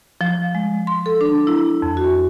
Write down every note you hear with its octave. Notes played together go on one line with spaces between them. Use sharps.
F3
G#3
C6
A4
D4
E4
F2
F#4